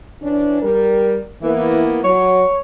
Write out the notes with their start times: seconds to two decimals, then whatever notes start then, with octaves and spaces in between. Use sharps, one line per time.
0.21 E3 C#4 D4
0.62 G3 A#4
1.42 E3 A#3 B3 E4
2.04 F#3 C#5